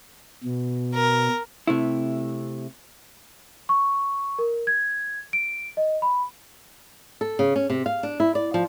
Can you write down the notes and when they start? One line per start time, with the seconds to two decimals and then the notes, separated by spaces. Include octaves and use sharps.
0.44 B2
0.95 A#4
1.67 C3 A3 E4
3.69 C#6
4.39 A#4
4.67 G#6
5.33 D7
5.77 D#5
6.02 B5
7.21 A4
7.39 C#3
7.56 C#4
7.70 C3
7.86 F5
8.03 D4
8.20 E4
8.35 D5
8.54 F3